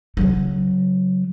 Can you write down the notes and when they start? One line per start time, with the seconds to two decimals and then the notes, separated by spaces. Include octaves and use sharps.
0.17 C#3 F#3